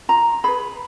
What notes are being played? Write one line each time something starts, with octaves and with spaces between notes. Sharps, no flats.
F4 A#5
G#4 B4 B5